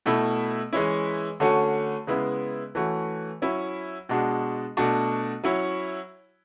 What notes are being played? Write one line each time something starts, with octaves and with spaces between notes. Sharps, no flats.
B2 A3 E4
E3 G#3 C#4 E4
D3 A3 C#4 F#4
C#3 G#3 B3 E4
E3 A3 C#4 F#4
F#3 C#4 E4
B2 G#3 D4 F#4
B2 A3 D4 F#4
F#3 C#4 E4